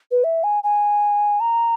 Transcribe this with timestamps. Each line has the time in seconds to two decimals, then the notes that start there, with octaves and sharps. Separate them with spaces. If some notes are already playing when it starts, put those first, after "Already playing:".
0.11 B4
0.24 E5
0.44 G#5
0.63 G#5
1.40 A#5